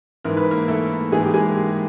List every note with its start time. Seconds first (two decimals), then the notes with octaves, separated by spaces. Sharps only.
0.24 G#2 E3 A#4
0.37 B4
0.51 A#3 A#4
0.68 A3 A4
1.12 G#2 E3 G#4
1.23 G4
1.34 G#3 G#4